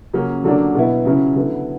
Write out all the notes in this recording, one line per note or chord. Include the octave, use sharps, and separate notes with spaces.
C#3 F#3 A#3 C#4
D3 F#3 A#3 D4
B2 F#3 B3 E4
C#3 F#3 C#4 E4
D3 F#3 B3 E4